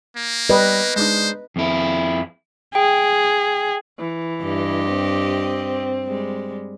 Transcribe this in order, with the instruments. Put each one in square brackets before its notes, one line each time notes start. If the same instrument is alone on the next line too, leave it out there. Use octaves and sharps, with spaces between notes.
[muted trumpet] A#3
[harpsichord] G3 [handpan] B4 D#5
[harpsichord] G#3 D4 D#4 [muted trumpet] C5
[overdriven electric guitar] F2 E4
[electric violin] G#4 [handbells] G5
[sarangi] E3
[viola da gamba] G2 G4 D#5
[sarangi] C4
[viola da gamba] G3 G#3